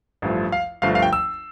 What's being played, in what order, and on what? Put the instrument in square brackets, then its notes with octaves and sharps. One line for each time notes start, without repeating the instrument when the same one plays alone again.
[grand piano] A1 G2 F3 A3
F5
G1 G2 F3 A3 F5
F5
G5
E6